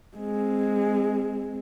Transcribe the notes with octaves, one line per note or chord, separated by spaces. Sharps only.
G#3 C4